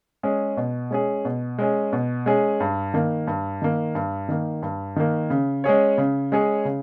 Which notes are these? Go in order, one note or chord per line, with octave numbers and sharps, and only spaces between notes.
G#3 C#4 G#4
B2
G#3 C#4 G#4
B2
G#3 C#4 G#4
B2
G#3 C#4 G#4
G2
D#3 A#3
G2
D#3 A#3
G2
D#3 A#3
G2
D#3 A#3
C#3
G#3 C#4 G#4 C#5
C#3
G#3 C#4 G#4 C#5
C#3